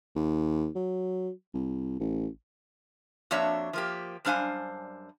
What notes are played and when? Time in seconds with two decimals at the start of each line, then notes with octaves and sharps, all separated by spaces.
0.16 D#2
0.75 F#3
1.54 C2
2.00 A1
3.31 F2 A#3 D4 F#4 C#5 E5
3.73 F3 A#3 G4
4.25 F#2 G3 D4 C5 F5 G#5